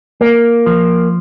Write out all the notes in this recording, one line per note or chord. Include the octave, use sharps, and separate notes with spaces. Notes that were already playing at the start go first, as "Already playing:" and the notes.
A#3
F3